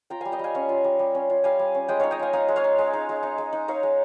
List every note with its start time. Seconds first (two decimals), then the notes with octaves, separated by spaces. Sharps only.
0.10 F4 G5 A#5
0.21 G3 F5 G#5
0.32 D#5 G5
0.39 G3 F5 G#5
0.54 C#4 F5 G#5
0.69 F4
0.84 G3
0.99 G3
1.15 C#4
1.30 F4
1.44 G3 F5 G#5
1.59 G3
1.75 C#4
1.88 G#3 D#5 G5
2.00 D#4 C#5 F5
2.11 D#5 G5
2.19 G#3 F5 G#5
2.33 D#4 F5 G#5
2.48 G#3
2.56 C#5 F5
2.64 D#4
2.79 G#3
2.93 D#4
3.09 G#3
3.23 D#4
3.38 G#3
3.53 D#4
3.68 D#4 C#5 F5
3.83 G#3